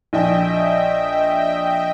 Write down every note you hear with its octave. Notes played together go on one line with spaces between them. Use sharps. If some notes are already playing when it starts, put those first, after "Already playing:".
A#1 D#5 E5 G5